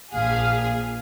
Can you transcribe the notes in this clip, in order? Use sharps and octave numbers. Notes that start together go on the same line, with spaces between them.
A#1 A#2 G#4 F5